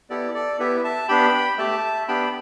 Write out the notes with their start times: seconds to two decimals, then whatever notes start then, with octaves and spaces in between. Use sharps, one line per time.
0.10 B3 E4 G4 A4 D5
0.34 A4 D5
0.59 B3 E4 G4 B4 E5
0.84 E5 A5
1.08 B3 D4 G4 G5 B5
1.58 A3 G4 E5 A5
2.08 B3 D4 G4 G5 B5